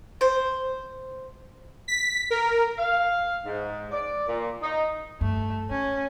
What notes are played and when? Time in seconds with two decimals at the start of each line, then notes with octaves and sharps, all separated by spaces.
0.21 C5
1.88 B6
2.30 A#4
2.78 F5
3.46 G#2
3.92 D5
4.28 A#2
4.62 D#4
5.21 G2 A3
5.70 G#3 C#4